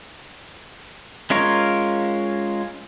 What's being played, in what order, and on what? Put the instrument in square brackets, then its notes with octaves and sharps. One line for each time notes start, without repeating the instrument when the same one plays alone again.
[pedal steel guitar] G#3 C#4 F4 A#4 C#5